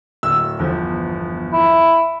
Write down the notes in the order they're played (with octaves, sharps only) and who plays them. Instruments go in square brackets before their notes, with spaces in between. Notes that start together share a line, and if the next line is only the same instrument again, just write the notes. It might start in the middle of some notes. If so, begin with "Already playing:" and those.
[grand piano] D1 E6
G1 E2 F3
[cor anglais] E4